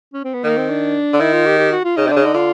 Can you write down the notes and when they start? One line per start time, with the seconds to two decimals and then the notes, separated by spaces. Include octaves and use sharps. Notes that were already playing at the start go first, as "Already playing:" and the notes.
0.14 C#4
0.24 C4
0.34 B3
0.44 D#3 A#3
0.57 C4
0.70 D4
1.13 D3
1.20 D#3 E4
1.33 F4
1.46 G4
1.59 G4
1.72 F#4
1.84 F4
1.97 C#3 D#4
2.07 C3
2.09 D3 D4
2.16 C#3
2.22 D3 D#4
2.34 D3 F4